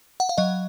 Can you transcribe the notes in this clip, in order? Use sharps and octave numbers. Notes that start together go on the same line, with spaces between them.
F#5
F5
F#3 D#5